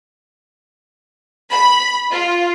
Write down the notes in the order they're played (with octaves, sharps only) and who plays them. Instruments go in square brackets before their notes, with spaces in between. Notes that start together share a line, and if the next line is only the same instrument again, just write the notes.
[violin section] B5
F4